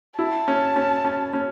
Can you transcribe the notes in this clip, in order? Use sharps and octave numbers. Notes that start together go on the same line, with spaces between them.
E4 A5
C#4
C#4
C#4
C#4